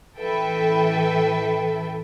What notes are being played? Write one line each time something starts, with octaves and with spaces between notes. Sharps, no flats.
A1 E3 A4 B4 E5 G5